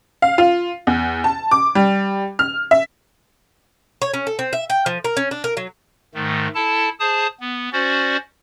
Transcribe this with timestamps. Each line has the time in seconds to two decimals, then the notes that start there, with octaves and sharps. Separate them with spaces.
0.22 F5
0.38 F4
0.87 E2
1.24 A5
1.51 D6
1.75 G3
2.39 F6
2.71 E5
4.02 C#5
4.14 C#4
4.27 A4
4.39 C4
4.53 E5
4.70 G5
4.86 F3
5.04 A#4
5.17 C#4
5.31 D4
5.44 A#4
5.57 F#3
6.15 G#2 D#3 A3
6.55 E4 A4 A5
7.00 G#4 C5 A5 D#6
7.40 B3
7.73 C#4 F#4 C5 D5